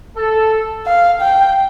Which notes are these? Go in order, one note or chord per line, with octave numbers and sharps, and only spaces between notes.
A4
F5
G5